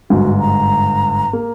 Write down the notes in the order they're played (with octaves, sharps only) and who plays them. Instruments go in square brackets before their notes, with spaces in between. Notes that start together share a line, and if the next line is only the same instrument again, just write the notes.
[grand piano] G1 G#2 [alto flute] F#4
[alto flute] A#5
[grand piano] A#3